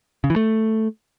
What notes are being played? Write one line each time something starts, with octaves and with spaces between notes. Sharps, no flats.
C#3
E3
A3